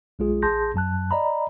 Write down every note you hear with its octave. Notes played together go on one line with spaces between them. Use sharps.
B1 G#3 F4 G#4
A1 G#4 A5 C6 G6 A#6
F#2 F#3 A5 F#6
D5 D#5 A#5 B5